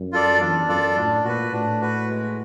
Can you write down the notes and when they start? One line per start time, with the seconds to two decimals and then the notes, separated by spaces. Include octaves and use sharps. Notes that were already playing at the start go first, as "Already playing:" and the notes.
Already playing: F#2
0.12 F4 A4 D5
0.40 E2 D4
0.69 F#2 F4 A4 D5
0.96 A2 D4
1.25 A#2 F#4 B4
1.52 A2 D4
1.81 F#4 B4
2.09 G#3